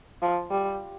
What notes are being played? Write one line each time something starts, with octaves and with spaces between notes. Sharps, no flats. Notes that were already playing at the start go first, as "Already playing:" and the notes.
F3
G3